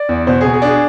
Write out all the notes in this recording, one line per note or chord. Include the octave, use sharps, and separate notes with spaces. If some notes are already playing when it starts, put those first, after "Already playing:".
Already playing: D5
E2
B2 C5
G#4
B2
G#4
D4
G#4